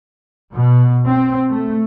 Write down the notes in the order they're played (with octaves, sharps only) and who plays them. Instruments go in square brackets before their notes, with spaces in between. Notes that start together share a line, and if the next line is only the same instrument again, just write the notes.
[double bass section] B2
C4
A3